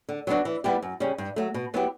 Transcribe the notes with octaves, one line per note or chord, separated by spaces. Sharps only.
D3
F#3 B3 D4 F#4
E3
G3 B3 E4 G4
F#2
C#3 G3 C#4
G2
F#3 A3
B2
F#3 B3 E4 G4